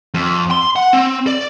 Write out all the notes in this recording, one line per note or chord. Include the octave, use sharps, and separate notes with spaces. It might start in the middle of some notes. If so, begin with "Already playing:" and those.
F2
C6
F#5
C4
D5